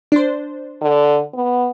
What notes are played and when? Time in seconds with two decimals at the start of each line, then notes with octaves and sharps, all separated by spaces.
0.12 D4 C5
0.82 D3
1.34 B3